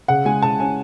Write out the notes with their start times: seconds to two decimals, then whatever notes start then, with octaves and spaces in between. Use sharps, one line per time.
0.08 C#3 F#5
0.25 G#3 G#5
0.42 C#3 A5
0.60 C#4 G#5